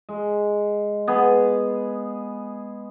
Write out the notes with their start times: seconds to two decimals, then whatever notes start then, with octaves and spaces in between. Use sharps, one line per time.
0.09 G#3
1.08 B3 G#4